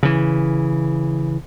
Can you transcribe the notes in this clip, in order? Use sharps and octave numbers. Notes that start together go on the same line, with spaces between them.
C#3 E3